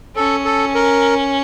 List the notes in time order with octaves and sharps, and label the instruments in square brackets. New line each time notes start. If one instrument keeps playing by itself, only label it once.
[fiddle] C#4 [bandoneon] A4
[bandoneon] A4
A#4